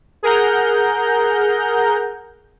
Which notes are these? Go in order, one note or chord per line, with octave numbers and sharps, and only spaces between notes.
G#4 A#4 F#5 A#5 G6